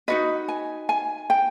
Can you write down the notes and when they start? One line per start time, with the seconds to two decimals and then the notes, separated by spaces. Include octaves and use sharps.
0.08 D#4 F#4 B4 D#5
0.48 G#5
0.89 G#5
1.30 G5